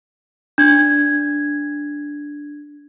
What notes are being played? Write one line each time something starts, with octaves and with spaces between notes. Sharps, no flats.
D4 G#6